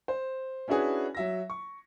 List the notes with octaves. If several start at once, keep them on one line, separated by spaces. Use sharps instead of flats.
C5
C#4 D4 E4 F#4 G#4 B4
F#3 E5 A#6
C#6